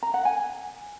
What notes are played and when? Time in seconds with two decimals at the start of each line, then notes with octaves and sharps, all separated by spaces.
0.03 A#5
0.14 F#5
0.25 G#5